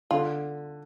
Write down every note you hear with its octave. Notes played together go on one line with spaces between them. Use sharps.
D3 F4